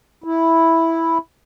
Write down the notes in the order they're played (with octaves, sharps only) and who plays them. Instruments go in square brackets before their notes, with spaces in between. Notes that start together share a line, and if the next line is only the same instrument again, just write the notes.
[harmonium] E4